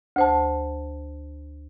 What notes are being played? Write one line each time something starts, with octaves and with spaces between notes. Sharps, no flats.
D2 C5 A5